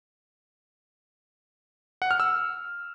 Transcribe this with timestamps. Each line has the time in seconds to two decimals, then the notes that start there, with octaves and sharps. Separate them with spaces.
2.02 F#5
2.11 F6
2.20 E6